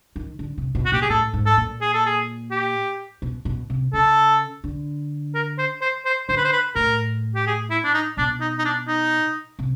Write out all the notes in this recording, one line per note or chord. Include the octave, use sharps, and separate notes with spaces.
D#3
D3
C3
B2
F#4
A#2 G4
G#4
A2 A4
G#2
A4
A#2
G#4
A4
G#4
G4
B2
B2
C3
C#3 A4
D3
A#4
C5
C5
C5
D3 C5
B4
C5
B4
A2 A#4
G4
G#4
E4
D4
D#4
B2 D4
D#4
D#4
D4
D#4
C3